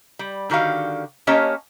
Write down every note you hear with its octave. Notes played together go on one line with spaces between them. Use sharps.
G3
D3 D#3 F#4 G4 F5
A#3 C#4 G4 C#5 D#5 A5